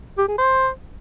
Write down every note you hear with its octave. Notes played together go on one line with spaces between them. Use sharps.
G4
G#4
C5